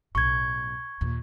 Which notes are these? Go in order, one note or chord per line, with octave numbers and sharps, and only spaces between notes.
B1 A2 C#6 G#6
D#2 A#2